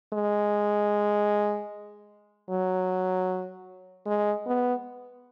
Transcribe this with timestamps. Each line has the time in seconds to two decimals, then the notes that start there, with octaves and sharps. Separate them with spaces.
0.13 G#3
2.49 F#3
4.06 G#3
4.46 B3